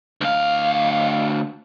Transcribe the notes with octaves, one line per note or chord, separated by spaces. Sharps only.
D2 F5